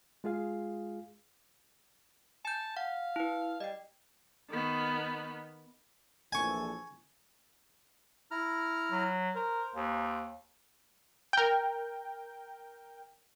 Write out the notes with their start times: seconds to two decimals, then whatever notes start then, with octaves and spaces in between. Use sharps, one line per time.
0.24 G#3 F4 G#4 F5
2.45 G#5 A5 G6
2.77 F5 F#5
3.16 E4 B4
3.60 G3 D#5 G5
4.50 D#3 B3
6.33 A#1 E3 A4 G#5 C#6
8.31 E4 A#5 F6
8.91 F#3
9.35 A#4 C5
9.75 D#2
11.33 A#4 G5